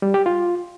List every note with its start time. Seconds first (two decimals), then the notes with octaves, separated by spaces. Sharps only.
0.02 G3
0.14 G4
0.26 F4